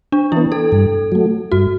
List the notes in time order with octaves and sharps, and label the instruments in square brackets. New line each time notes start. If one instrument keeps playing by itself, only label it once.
[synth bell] D4
[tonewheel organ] E3 B3 [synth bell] E4
[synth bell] A4
[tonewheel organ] G2
F#3 A3
[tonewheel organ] G2 [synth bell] F#4